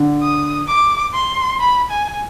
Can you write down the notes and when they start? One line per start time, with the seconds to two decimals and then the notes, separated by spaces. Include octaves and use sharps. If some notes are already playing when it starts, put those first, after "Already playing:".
Already playing: D3
0.22 D#6
0.68 D6
1.14 C6
1.60 B5
1.91 G#5